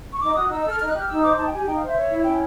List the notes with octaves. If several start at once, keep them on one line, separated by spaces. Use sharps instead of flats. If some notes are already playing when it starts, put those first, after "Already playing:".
C#6
D#4 D6
F#4 D#6
D#4 E6
E6
A4 F6
D#4 F6
F#6
G4
F6
D#4 E6
C5 D6
D#4 A5
G5
G4 G#5
D#4 G5
F5
C5
E5
C#5
E4
C#4 G5